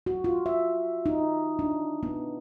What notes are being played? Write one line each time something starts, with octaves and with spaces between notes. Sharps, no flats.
F#4
F4
E5
D#4
D4
B3